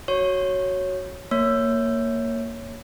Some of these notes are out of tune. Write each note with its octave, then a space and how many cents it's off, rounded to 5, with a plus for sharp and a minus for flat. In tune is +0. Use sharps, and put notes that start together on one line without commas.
F#4 +10 C#5 -5 C#6 -20
A#3 -10 C#5 +0